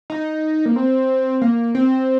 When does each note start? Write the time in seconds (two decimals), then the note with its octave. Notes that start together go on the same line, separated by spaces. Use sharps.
0.10 D#4
0.66 A#3
0.76 C4
1.41 A#3
1.75 C4